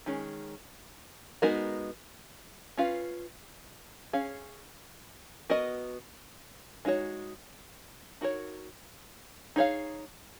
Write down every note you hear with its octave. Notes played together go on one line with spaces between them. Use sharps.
D#3 G#3 C#4 G#4
G#3 B3 D#4 F#4 A#4
C#4 F4 B4 F5
C#4 G#4 C#5 F5
B3 F#4 A#4 D#5
G#3 D#4 F#4 C#5
D#4 F#4 A#4 C#5
D#4 G#4 C#5 F5